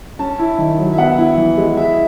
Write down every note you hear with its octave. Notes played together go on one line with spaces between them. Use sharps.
C#4 A5
E4
D#3
F#3
E5
B3 F#5
E4
E3
G#3
E4 E5